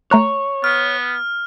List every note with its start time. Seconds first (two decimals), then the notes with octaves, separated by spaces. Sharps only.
0.11 A3 C#5 A#5 F#6
0.64 B3 F6